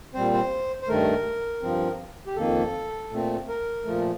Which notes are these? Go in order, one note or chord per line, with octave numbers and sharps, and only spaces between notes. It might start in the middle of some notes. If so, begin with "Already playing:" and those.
A#2 G3 C4 C5
C5
C5
G2 D#3 A3 A#4
G2 F3 C4
G4
F2 D#3 A#3 A4
A#2 A3 C4
A#4
A#2 F3 A3